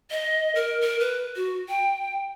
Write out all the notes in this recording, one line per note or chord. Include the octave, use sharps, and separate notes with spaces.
D#5
A#4
A#4
B4
F#4
G5